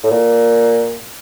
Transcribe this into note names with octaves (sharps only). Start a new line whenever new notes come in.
A2
A#2